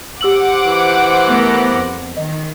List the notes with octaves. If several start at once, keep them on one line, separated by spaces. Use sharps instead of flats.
G4 C5 F#5 D6 E6 F#7
E3
A3 B3 A#4
F2
D#3 D#5